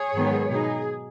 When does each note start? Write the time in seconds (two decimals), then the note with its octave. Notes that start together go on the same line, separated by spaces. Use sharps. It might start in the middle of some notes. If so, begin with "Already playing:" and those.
Already playing: G#4 C#5
0.14 G#2 D#3 F#3 B3
0.49 B2 F#3 D#4 G#4